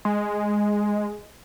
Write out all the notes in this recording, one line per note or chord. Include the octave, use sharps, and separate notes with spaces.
G#3